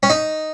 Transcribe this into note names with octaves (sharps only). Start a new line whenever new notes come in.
C#4
D#4